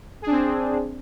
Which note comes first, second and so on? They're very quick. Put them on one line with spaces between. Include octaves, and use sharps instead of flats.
G#4 D4 C4